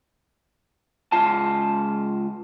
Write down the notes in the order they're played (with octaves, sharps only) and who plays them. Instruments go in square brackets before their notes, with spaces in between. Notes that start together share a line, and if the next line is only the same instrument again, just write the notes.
[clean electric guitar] C#2 F4 A5